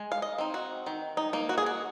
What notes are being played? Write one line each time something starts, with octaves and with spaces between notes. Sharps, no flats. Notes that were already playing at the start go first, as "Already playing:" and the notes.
Already playing: G#3
F5
D#5
C4 D#4
F#4
D#3
D#4
A#3 D#4
F#4
G#4
F#4